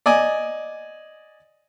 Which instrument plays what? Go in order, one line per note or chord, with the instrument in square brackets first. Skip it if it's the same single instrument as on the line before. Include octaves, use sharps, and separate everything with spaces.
[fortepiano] D5 D#5 G#5